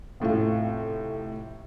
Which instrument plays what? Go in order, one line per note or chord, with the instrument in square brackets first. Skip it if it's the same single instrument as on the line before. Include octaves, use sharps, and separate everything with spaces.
[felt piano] F1 A2 C3 F4